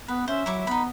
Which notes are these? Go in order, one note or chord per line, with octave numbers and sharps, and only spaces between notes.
B3 B4
C#4 C5 E5
F#3 E4 C#6 D6
B3 D#4 B5